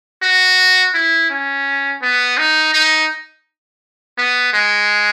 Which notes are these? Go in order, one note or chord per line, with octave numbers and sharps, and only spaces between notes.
F#4
E4
C#4
B3
D#4
D#4
B3
G#3